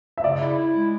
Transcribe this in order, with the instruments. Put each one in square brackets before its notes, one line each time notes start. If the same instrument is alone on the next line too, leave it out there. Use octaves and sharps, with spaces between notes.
[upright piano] E5
[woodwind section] C#3 [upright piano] D5
[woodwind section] E4
E4
G#3